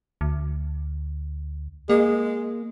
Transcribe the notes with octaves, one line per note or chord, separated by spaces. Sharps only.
D2
G#3 A#3